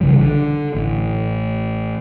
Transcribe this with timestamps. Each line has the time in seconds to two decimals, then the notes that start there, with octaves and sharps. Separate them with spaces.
0.01 B1 C#3 E3 G3
0.21 D3
0.75 A1